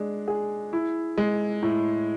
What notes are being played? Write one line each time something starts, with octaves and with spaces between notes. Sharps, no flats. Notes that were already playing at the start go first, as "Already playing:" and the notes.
Already playing: G#3 D4
G#4
E4
G#3
A2